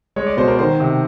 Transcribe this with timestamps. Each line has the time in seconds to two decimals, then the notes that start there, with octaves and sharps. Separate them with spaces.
0.16 G#3 C#5
0.26 D5
0.37 B2 C5
0.48 A#4
0.59 D#3 C5
0.80 C3